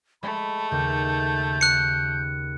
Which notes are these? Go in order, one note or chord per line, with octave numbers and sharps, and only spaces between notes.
G#3 A3 B5
D#2 C#3 G6
F#6 C#7